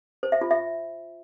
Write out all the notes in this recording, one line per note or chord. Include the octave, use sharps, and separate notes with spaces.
C5
E5
F4
E5